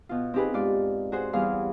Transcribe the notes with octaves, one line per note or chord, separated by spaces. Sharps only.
B2 F4
C4 D#4 G4 G#4 B4
G#2 F4 D5
F#4 G#4 C5
E2 G3 G#4 F5 F6